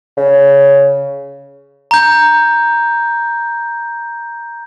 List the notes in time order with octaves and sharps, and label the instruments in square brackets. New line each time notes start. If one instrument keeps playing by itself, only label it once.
[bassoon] C#3
[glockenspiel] A#5 G6